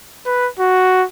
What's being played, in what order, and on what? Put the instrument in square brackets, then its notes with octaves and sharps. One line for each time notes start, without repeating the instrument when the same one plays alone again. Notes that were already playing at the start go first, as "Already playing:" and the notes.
[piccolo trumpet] B4
F#4